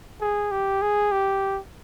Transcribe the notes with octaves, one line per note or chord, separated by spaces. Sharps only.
G#4
G4
G#4
G4